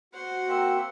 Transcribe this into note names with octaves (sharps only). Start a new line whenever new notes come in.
F#4 C5 F#5
A#3 C4 E5